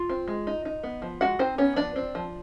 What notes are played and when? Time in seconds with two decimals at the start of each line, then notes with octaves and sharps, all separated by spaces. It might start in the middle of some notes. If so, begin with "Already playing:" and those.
Already playing: F4
0.09 C4
0.28 G#3
0.47 D#4
0.65 D#4
0.83 B3
1.02 F3
1.21 G#3 F#4 F#5
1.39 C4 D#4 C5
1.58 B3 C#4 C#5
1.76 F3 D4 D5
1.96 C4
2.15 F3